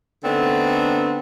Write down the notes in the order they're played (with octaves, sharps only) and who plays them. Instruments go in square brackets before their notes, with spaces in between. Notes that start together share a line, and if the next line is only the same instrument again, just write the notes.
[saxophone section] D3 A3 B3 C4 D4 D#4